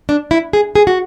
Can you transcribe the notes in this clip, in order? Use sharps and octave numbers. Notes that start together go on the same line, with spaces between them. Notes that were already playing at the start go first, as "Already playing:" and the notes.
D4
E4
G#4
G#4
F#4